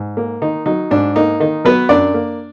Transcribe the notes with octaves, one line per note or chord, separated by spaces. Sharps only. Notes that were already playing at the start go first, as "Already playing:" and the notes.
Already playing: G#2
A#3
D#3 D#4
F#3 D#4
G#2 D4
A#3 D#4
D#3 D#4
F#3 B3 B4
F#2 D4 D5
A#3